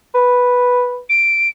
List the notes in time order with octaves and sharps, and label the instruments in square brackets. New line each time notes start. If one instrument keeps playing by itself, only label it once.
[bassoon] B4
[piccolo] D7